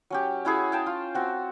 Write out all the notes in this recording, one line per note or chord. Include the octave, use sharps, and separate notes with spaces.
F#3 C#4 G4
C#4 E4 F#4 G#4
F5 G5 A5
F4
C4 F#4